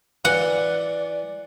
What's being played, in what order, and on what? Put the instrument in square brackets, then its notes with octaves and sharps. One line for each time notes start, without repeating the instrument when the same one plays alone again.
[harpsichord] E3 [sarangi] D5 [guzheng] F#5